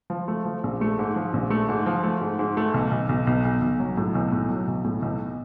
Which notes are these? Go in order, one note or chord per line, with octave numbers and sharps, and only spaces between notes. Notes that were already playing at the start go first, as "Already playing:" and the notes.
F3
A3
F3
A#1
A3
G#2
F3
A#1
A3
G#2
F3
A3
G#2
G#2
A3
B1
B1
B1
B1
B1
B1
F#3
A2
B1
A2
F#3
B1
A2
B1